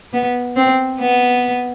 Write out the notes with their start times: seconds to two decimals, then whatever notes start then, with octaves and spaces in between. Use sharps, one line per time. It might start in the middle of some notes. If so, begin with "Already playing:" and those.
0.13 B3
0.56 C4
1.00 B3